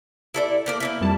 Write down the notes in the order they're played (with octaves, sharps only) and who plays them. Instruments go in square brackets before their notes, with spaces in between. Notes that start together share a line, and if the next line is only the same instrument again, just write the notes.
[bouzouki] E4 A4 D5
A3 A#3 D5
A#3 C4 E4
[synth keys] F2 G3 A5